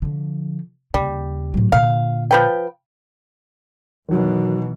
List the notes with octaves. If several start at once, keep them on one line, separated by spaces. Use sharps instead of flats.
D3 F3
D#2 C#3 G3
A2 F#3
A#2 D3 F5
F3 B4 G5
F#2 B2 D#3 E3 F#3